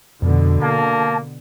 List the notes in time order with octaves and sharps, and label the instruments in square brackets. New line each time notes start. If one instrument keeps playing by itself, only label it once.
[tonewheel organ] F2 [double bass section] B2 D3
[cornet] A#3 [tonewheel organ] A5